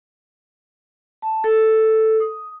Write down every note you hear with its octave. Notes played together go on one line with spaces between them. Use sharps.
A5
A4
D#6